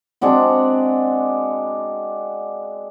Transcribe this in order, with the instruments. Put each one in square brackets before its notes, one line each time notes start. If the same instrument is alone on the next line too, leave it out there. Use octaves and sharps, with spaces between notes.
[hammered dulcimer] G#3 C4 D4 F#4